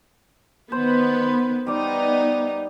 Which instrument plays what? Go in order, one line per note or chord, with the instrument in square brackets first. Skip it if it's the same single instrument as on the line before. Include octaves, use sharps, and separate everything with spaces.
[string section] D#3 B3 B4 [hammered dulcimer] C5
[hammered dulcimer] G3 D5 [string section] B3 D#4